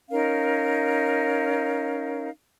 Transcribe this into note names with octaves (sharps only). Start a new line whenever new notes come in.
C#4 D#4 A#4 F5